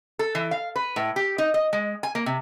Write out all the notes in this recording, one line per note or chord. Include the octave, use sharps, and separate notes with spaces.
A4
E3
F5
B4
A2
G4
D#4
D#5
G#3
G#5
A#3
C3